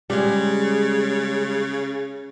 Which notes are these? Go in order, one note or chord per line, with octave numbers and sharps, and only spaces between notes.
C#3 G3 G#3